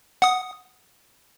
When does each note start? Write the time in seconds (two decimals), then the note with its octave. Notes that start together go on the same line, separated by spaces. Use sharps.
0.22 F#5 D#6